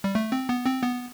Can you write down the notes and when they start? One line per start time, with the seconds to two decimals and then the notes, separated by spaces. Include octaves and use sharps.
0.04 G3
0.15 A3
0.32 C4
0.49 B3
0.66 C4
0.83 B3